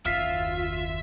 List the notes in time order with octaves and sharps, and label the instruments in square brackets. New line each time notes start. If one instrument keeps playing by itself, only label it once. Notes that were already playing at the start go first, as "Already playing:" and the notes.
[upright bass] F#1 D#2 [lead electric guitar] F4 [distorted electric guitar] E5 [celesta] F6 B6 C7